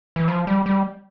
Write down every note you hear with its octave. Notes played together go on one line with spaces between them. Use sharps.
E3
F3
G3
G3